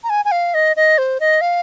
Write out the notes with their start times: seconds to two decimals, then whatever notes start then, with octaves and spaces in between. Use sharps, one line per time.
0.04 A#5
0.10 G#5
0.25 G#5
0.32 F5
0.54 D#5
0.76 D#5
0.98 C5
1.20 D#5
1.41 F5